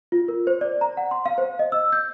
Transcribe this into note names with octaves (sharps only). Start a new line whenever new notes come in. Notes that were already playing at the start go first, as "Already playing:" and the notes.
F4
A#4
C5
D5
A#5
F#5
C6
F5
C5
D#5
E6
G6